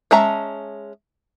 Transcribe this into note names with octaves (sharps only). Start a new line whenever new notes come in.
G#3 C#4 E5 A5 A#5